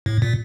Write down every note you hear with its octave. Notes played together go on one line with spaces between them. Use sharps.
A2
A#2